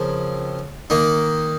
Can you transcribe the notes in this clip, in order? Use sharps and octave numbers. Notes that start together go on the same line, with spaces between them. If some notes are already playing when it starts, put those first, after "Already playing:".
Already playing: C#3 F3 C4 A#4
D#3 A#3 D#4